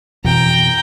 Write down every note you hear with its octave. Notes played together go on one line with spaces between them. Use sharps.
F2 B2 E3 G5 A#5